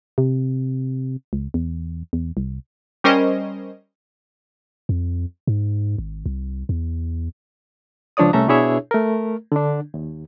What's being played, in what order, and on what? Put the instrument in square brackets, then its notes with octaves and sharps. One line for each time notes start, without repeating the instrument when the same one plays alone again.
[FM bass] C3
C#2
E2
E2
C2
[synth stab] G3 C#4 A#4 C5 D#5
[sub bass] F2
G#2
G#1
C2
E2
[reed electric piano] C#2 F3 D4 C#5 D5 D#6
C2 A3 C#4 A4 E5 A#5
B2 D4 E4 G#4 C#5 E5
A3 A#4
D3 D4
D#2